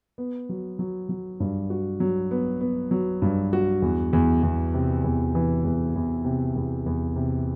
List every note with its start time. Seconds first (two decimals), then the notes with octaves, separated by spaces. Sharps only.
0.18 B3
0.49 F#3
0.79 F#3
1.09 F#3
1.40 G2
1.70 F#4
2.00 F#3
2.31 B3
2.61 B3
2.91 F#3
3.22 G2
3.53 F#4
3.82 E2
4.13 E2
4.43 E2
4.74 C3
5.04 E2
5.35 E3
5.64 E2
5.96 E2
6.25 C3
6.56 E2
6.86 E2
7.16 C3